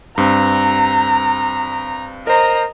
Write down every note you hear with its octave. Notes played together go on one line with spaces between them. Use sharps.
G2 C4 A#5
A#4 C5 D#5 A#5